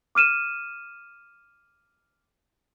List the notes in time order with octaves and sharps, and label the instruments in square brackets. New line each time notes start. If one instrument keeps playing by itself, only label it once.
[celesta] D6 F6 D#7 E7